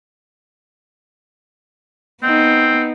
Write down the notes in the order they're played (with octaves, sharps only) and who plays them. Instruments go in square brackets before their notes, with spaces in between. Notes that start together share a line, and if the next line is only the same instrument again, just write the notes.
[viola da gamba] B3 D#4 [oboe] C4